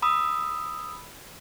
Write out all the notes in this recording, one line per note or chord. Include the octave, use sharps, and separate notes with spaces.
B5 D#6 E6